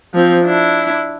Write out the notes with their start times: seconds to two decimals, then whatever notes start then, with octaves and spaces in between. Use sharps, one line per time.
0.14 F3 C4
0.45 D4 E4